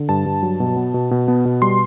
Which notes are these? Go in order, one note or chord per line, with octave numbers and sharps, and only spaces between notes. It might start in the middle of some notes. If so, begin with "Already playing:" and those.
Already playing: D3
G2 A5
G2
F#3
B2
B3
B2
B2
B3
B2
G3 C6